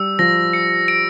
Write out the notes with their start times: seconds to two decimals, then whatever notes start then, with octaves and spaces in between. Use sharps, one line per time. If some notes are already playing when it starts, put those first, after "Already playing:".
Already playing: G3 E6
0.19 F3 A#6
0.53 C#7
0.88 D7